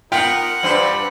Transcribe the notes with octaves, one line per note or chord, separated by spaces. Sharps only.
B3 D#4 F4 A#4 F#5 G5 B6
G2 C4 D4 C5 B5